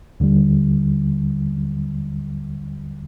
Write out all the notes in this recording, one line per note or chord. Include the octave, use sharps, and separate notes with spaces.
D#2 D3 G3